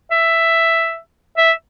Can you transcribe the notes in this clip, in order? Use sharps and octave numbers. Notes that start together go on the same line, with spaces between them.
E5
E5